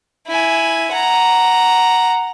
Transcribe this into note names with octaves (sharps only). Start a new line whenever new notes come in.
E4 G#5
F#5 A#5